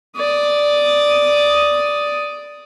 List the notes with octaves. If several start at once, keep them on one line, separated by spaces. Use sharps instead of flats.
D5 D#6